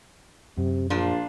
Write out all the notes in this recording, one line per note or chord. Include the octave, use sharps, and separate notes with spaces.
F#2 C3
A#1 A#2 D4 F4